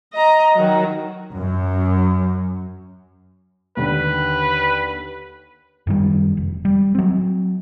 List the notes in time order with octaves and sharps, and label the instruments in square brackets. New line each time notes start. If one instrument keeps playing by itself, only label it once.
[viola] D#5 A#5
D#3 F#3
[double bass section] F#2
[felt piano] D#2 D3 [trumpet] B4
[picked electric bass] F#2 D#3 G3
F1
G3
F#3 C4